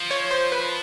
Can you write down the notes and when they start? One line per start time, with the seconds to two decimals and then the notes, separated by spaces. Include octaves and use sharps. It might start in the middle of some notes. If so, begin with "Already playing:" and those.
Already playing: F3
0.11 C#5
0.31 C5
0.52 B4